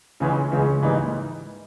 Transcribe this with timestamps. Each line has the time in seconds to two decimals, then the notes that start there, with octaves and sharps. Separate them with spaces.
0.20 C#2 C#3 E3 G#3 C#4
0.52 C#2 C#3 E3 G#3 C#4
0.82 G#2 E3 G3 A#3 D#4